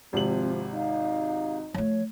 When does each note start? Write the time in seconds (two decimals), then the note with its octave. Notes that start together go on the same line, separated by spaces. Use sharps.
0.13 G#1 C3 F3 C4 F#7
0.74 D#4 F5
1.74 F3 A3 C#5